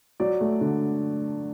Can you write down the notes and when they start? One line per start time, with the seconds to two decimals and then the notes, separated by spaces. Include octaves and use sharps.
0.20 F#3 D5
0.41 A3
0.61 D3